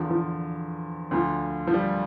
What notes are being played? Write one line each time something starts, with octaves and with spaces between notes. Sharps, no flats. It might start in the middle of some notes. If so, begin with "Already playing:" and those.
Already playing: E2 D3 F3
F3
D2 D3 F3
F3
G3